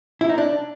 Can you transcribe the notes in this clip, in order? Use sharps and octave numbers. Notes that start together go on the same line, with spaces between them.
E4
D#4
D4